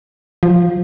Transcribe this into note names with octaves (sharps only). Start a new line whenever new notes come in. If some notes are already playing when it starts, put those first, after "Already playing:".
F3